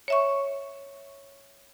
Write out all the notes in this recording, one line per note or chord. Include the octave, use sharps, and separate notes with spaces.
C#5 E5 C#6